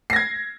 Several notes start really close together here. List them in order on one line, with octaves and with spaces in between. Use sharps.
C7 A#6 G#6